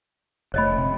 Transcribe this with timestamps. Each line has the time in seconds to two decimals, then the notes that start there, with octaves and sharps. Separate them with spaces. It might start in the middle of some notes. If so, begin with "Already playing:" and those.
0.54 F1 A3 C#5 D#5 B5
0.78 C3